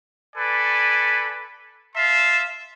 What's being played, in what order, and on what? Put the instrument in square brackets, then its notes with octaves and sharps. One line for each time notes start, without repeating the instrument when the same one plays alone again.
[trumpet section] A4 B4 D5 G#5
E5 F5 A5 C6